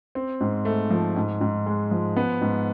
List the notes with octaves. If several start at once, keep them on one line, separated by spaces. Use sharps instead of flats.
C4
G#2
A3
F3
G#2
G#2
G#3
F3
B3
G#2